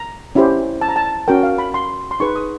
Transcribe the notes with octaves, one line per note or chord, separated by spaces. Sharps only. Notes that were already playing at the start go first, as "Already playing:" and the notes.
Already playing: A#5
C#4 E4 G4 C5
A5
A#5
A5
C#4 F#4 A#4 G5
F5
B5
C6
C6
D#4 G#4 B4 C#6
D#6